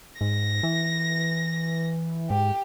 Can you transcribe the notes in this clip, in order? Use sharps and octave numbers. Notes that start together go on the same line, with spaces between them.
G#2 A#6
E3
G#2 G4